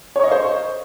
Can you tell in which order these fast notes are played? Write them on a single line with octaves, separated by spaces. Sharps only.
C#5 C#6 D#5 F5 C5